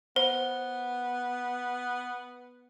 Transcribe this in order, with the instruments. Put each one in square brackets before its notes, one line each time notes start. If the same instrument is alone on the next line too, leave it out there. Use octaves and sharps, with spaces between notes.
[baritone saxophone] B3 [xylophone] C5